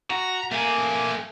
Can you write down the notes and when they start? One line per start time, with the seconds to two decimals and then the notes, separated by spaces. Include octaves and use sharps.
0.10 F#4 A#5
0.52 A3 A#3 G#5